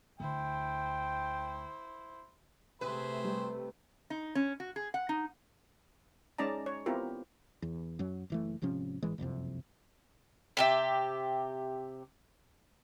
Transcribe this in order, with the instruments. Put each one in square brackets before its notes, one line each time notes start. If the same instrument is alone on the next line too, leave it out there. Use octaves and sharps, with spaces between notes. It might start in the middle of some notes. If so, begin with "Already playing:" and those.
[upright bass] D2 [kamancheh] E4 C5 [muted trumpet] G5
[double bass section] C3 A3 [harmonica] G#4 C5 E5 [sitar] B4
[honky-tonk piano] G3
[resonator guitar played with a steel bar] D#4
C#4
F#4
G#4
F#5
D#4
[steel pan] G#3 C#4 D#4 D5 A5 A#5
C#5
B3 C4 E4 F4 G4 A#4
[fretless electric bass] E2
F#2 F#3
F#1 E3 A3
G#1 C3 F3 C#4
G#1 E3 G#3
F#1 C2 F2 C3
[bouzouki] C3 G4 E5